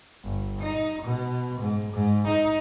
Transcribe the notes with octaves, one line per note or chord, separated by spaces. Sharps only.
G1
D#4
B2
G#2
G#2
D#4